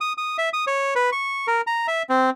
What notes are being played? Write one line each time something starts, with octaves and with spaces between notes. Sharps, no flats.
D#6
D#6
E5
D#6
C#5
B4
C#6
A#4
A#5
E5
C4